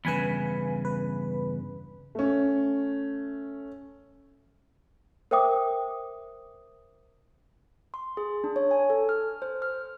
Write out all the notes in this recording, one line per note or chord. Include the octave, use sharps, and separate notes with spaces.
E2 G2 C#3 B4 G#5 B5
B4
A3 C#4
A#4 C5 E5 G5 D6 D#6
C6
G#4
D4
C#5
G#5
A4
F6
C5
F6